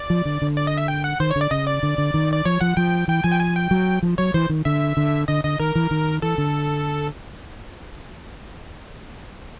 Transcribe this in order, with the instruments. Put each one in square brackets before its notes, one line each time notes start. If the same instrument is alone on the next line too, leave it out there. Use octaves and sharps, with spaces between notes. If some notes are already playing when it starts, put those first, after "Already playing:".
Already playing: [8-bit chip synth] D5
[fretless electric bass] F3
D3
D3
[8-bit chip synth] D5
D#5
E5
G5
F#5
[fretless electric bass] D#3 [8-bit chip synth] C5
[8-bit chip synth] C#5
[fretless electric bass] D3
[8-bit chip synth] D5
[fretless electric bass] C#3 [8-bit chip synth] D#5
[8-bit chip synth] D5
[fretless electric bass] D3
D3
D#3
[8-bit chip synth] D5
[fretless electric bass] F3 [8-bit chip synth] C#5
[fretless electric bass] F3 [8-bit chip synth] F#5
[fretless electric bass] F3 [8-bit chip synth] G5
[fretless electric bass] E3 [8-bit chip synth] G5
[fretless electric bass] F3 [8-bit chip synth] G#5
[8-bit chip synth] G5
G#5
G5
[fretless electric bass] F#3
F3
[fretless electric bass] F#3 [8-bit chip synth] C#5
[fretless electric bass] E3 [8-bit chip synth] C5
[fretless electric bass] D#3
[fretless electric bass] D3 [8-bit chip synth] E5
[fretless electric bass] D3
[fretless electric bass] D3 [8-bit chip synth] D#5
[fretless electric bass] D3 [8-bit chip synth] D#5
[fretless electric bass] D#3 [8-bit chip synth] A#4
[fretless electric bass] E3
D#3
[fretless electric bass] E3 [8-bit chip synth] A4
[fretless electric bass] D3